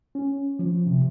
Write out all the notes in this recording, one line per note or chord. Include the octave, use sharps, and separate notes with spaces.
C#4
F3
C3